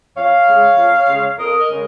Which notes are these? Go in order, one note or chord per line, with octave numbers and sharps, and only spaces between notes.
F2 C#5 F5
C#3 G#3
F2
C#3 G#3
F2 A#4 D#5
A#4 D#5
C#3 G#3